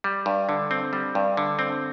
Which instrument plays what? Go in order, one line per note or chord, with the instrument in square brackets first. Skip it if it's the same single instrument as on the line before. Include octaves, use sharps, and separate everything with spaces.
[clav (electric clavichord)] G3
G2
D3
C4
G3
G2
D3
C4